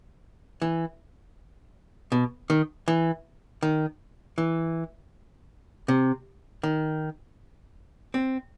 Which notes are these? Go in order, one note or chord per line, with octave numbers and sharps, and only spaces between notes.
E3
B2
D#3
E3
D#3
E3
C3
D#3
C4